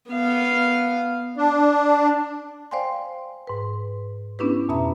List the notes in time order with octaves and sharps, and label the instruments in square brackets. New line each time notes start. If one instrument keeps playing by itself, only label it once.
[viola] B3 F5
[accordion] D4
[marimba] C5 D5 F5 G5 G#5 C6
G#2 B4
B3 C#4 D4 E4 G4 B4
F2 B2 E5 A#5 B5